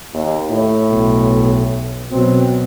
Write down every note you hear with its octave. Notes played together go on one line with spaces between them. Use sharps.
D#2
A2
B1
B2 F#3 C4